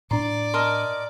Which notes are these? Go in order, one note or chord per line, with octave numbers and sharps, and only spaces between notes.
A2 D4 D5 A#5 C6 D6
A#4 D#5 A5 C6 F6